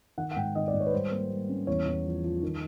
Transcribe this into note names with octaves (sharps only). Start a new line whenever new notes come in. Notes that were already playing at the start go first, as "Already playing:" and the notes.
D#3 F#5
F#5
G#2 G5
D#3 D#5
D5
G#2
C#5
B4
G3 C5
A#3
G3
C#4
E2 C#5
E2
F3
F3
D#3